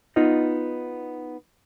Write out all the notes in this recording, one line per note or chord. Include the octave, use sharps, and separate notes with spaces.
B3 D#4 F4 D#5